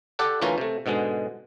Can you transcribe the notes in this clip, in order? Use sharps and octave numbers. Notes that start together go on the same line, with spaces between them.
G4 A4 D5 F#5 A5
D2 E3 C#4 F4 A#4
C3 A3
G#2 B2 D3 G#3